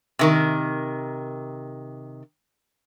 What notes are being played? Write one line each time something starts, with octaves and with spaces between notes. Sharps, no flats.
C3 D#3 A#4